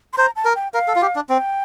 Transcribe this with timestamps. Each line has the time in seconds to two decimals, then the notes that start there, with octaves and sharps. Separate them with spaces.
0.13 C6
0.18 C5 A#5
0.36 A5
0.45 A#4
0.55 G5
0.74 A#4 F5
0.88 A4
0.96 F4
1.02 G4
1.15 D4
1.29 C4 G5